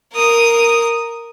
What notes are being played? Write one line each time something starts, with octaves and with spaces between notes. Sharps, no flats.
A#4 D#6